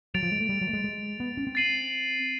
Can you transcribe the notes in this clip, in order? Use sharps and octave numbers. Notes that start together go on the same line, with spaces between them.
F#3 A6 D7 F7
F3
G#3
A3
G3
F#3
A3
G#3
G#3
B3
C#4
C4
A6 C7 D#7 F#7